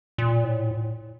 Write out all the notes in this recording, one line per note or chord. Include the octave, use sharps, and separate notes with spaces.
A#2
A2